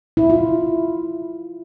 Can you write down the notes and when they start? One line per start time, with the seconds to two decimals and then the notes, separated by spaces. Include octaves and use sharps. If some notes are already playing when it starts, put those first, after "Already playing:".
0.17 E4
0.30 F4